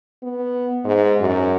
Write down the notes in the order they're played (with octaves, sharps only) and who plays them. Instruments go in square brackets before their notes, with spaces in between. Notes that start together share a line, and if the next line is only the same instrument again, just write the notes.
[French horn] B3
G#2
F#2